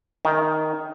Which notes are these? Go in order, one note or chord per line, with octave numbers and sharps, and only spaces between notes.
D#3